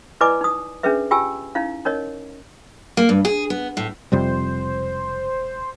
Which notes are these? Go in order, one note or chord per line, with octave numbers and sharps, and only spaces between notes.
E4 B4 D5 D#5 G#5 D6
D#4 D#6
C#4 D4 G#4 B4 E5
F4 G4 G5 G#5 E6
C#4 D#4 E4 F5
C#4 D#4 A#4 C#5 D#5
A#3
G2
G#4
B3
A2
E1 F2 C3 G3 C5